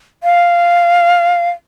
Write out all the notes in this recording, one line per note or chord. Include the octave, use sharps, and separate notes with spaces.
F5